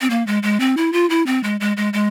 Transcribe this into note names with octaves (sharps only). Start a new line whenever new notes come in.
C4
A#3
G#3
G#3
C4
E4
F4
E4
C4
G#3
G#3
G#3
G#3